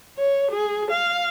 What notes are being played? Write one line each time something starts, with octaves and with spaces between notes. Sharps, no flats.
C#5
G#4
F5